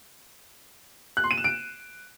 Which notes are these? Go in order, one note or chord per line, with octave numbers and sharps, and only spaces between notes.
F#6
C6
D#7
E7
D7